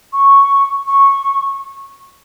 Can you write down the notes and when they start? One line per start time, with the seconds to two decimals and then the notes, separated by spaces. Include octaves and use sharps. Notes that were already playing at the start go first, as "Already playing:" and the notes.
0.13 C#6
0.88 C#6